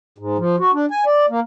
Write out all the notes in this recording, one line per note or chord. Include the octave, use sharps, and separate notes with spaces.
G#2
F3
F#4
D4
G#5
D5
A#3